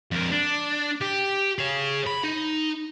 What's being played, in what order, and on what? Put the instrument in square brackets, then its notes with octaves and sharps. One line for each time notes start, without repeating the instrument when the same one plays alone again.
[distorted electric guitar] F2 A#4
D4
G4
G#4 C#5
B5
D#4